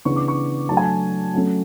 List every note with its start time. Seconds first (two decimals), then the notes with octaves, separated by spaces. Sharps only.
0.05 C#3 E3 B3 D4 C#6
0.16 D6
0.28 C#6
0.69 F#3 A3 D4 A5
0.77 G#5
0.85 A5
1.34 F#3 A3 C#4